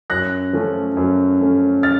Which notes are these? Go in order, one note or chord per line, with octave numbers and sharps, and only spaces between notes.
F#2 F#6 A#6
F3 A3 C#4
F#2
F3 A3 C#4
F6 A6